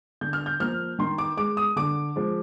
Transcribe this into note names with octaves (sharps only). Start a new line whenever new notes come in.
D3 G6
F6
G6
F3 A#3 F6
D#3 C6
D6
G#3 D6
D#6
D3 D6
F3 G#3